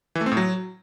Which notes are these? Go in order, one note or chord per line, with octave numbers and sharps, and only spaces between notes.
E3
A3
C4
A2
F#3